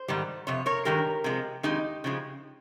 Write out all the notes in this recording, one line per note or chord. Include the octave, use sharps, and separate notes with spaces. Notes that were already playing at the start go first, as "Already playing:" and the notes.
Already playing: C5
G#2 D#3 G3
F2 C3 C#5
A#4 C#5
G2 D#3 G#3 G4 A#4
C3 F3 G#3
F2 D#3 G#3 D#4 G4
C#3 F3 G#3